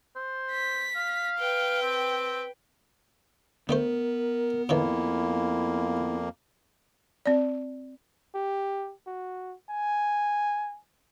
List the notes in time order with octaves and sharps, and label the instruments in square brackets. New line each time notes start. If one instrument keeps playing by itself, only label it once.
[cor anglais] C5
[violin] B6
[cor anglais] F5
[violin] B4 G5
[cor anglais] C4
[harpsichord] D3 A3 C5 [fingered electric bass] B3 [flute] A#4
[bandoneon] F2 A#3 [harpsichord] A2 D#3 E3 [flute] E4
[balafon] C4 D5
[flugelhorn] G4
F#4
G#5